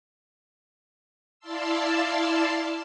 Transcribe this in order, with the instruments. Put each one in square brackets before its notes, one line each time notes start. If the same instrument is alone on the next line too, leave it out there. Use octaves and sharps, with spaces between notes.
[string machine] E4 D5 F5 A5 C6 E6